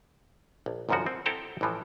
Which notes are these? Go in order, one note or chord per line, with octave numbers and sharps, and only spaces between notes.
A#1
G1 C2 F#2 C#3 F3 F#4
C4
C4 E4 A4 G5 A5 A#5
A1 A2 E3 F3